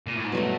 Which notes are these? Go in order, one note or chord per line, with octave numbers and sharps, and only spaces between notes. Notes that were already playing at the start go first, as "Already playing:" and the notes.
A#2
A2
G#2
G2 B2 F#3 A3